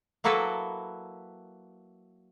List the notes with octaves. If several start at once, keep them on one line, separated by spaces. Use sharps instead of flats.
F#3 A#3 E4 F#4 A4 B4